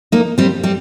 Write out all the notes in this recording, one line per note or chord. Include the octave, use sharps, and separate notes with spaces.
A#3 D#4
G3 C4
G3 C4